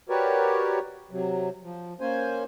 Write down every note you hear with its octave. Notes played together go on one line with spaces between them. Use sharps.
F#4 G4 A#4 B4 C#5 D5
C3 F#3
F3
A#3 C#4 C5 G#5